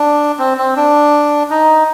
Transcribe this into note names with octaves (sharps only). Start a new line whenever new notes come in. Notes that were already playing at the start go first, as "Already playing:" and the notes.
Already playing: D4
C4
C4
D4
D#4